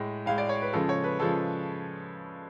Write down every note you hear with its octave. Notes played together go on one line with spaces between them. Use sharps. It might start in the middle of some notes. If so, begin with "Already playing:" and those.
Already playing: A2 G#3
A2 G#3 F5
D5
C#5
B4
C#3 F3 G#3 A4
C#5
B4
C#3 F3 G#3 A4